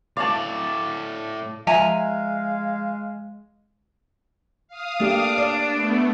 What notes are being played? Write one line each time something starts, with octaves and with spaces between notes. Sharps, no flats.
A2 D5 F5 A5
F3 G#3 E5 F5 G#5 A#5
F5 D#6
A3 A#3 D4 G4
D5
A3 B3